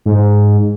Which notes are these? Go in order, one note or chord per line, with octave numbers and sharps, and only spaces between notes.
G#2